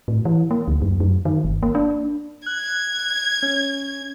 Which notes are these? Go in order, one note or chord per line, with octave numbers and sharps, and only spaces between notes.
A2
E3
A#3
D2
F#2
F#2
D#3
G1
A#3
D4
F#6 G#6
C#4